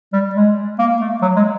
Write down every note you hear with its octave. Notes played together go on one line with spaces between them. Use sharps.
G3
G#3
A#3
A3
F#3
G#3